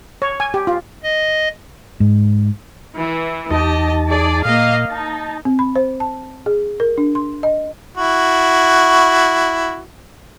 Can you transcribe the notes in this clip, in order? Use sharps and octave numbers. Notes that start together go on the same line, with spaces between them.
C#5
G#5
G4
F4
D#5
G#2
E3
E2 D#4 G4 D#5 A5
G#4 D5
A#2 A#3 D#5 F5
D#4 A5
C4
B5
C5
A5
G#4
A#4
D4
C6
D#5
E4 F#4